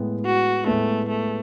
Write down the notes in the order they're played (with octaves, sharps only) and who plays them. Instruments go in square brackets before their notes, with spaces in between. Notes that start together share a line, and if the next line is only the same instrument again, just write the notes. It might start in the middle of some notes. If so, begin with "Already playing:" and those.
Already playing: [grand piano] A2 G#3 B3
[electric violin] F#4
[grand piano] A2 G#3 B3 [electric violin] A3
[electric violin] A3